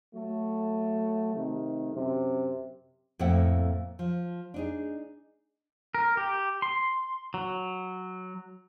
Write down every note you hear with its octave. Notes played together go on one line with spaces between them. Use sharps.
F#3 A3
C3 D#3 A3
F#2 C3
F2 A2 A#3 A4 E5 F#5
F3
D4 D#4 G#4
A#4
G4
C6
F#3